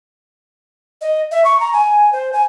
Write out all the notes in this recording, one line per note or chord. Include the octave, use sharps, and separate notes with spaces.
D#5
E5
C#6
A#5
G#5
C5
G#5